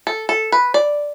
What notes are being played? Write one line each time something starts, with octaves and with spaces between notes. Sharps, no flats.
A4
A4
B4
D5